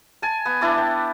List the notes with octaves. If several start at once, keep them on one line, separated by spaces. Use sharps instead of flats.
G#5 A5
B3
D4 E4 A5 D6
G5